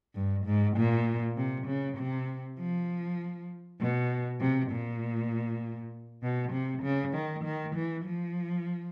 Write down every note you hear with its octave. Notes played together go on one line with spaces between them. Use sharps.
G2
G#2
A#2
C3
C#3
C3
F3
B2
C3
A#2
B2
C3
C#3
D#3
D#3
E3
F3